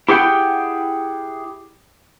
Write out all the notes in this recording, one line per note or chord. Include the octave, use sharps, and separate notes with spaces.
E4 G4 G#4 F#5 G5